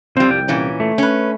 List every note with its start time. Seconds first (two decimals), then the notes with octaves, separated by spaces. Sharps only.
0.17 F2 G3 C4 C5
0.29 C2 G5
0.48 A#2 E3 C#4
0.80 A3
0.98 C#4 B4